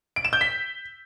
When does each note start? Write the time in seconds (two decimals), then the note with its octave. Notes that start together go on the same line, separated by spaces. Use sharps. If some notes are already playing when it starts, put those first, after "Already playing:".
0.16 D7
0.25 E7
0.33 G6
0.41 B6